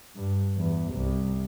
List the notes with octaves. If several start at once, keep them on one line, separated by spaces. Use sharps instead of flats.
G2
E2
C2